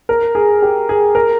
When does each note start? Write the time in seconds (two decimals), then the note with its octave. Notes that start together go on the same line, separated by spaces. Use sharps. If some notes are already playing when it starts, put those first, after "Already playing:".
0.09 A#4
0.35 G#4
0.62 G4
0.89 G#4
1.15 A#4